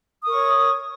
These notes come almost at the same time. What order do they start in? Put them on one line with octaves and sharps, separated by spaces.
D#6 A#4 C#6 C#5